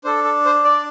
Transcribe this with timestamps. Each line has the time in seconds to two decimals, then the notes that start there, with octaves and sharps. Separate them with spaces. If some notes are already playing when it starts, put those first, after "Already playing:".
0.04 D4 A4 C5
0.24 A4
0.45 C5
0.65 D5